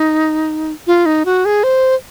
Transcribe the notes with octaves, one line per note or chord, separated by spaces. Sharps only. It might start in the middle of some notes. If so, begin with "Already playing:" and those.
Already playing: D#4
F4
D#4
F#4
G#4
C5